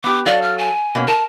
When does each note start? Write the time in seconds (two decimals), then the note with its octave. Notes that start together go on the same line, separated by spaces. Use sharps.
0.04 B3 G4 D6
0.26 F#3 A4 D5 F5
0.42 F6
0.58 G#5
0.95 B2 A#3 C#4
1.08 A#4 A5